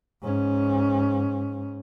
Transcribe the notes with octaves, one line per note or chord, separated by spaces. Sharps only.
G#2 C#4